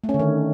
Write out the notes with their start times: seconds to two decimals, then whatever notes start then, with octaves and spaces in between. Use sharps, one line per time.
0.04 A3
0.09 C#4
0.14 D3
0.19 D#3